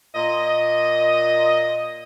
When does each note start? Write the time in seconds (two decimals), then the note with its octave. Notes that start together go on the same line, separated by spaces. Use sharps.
0.15 A#2 D#5